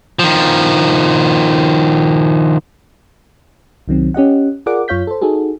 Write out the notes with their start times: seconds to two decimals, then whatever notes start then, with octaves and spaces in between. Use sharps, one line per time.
0.19 D#3 F3
3.88 C2 D#3 F#3 C4
4.14 C#4 G4 D#5 F#5
4.66 F4 G#4 A#4 D5 F#5 D6
4.88 F#2 F4 C#5 F5 G6 B6
5.07 A4 C5
5.21 D#4 F#4 G#4 A4